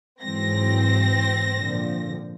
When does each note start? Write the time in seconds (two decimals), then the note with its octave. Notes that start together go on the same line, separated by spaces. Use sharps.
0.22 G#2 E3 F#3 C4 A#6
1.54 A#2 D3 F3